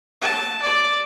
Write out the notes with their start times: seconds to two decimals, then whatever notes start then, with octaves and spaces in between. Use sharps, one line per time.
0.22 A5
0.62 D5